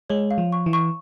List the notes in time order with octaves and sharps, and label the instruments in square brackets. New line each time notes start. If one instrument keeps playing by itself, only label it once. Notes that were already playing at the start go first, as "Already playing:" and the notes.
[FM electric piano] G#3 [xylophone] C#5
[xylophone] F5
[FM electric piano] F3
[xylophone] C#6
[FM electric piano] E3
[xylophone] C#6